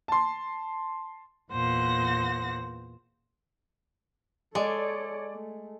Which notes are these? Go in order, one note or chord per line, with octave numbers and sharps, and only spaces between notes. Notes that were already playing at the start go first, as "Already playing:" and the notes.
A5 C6
E2 A#2 C5 F#5 A#6
G#3 A4 C#5 D5
A3